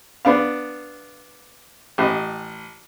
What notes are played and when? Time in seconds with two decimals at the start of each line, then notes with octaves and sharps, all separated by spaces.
0.25 B3 D4 F5
1.98 A1 D#5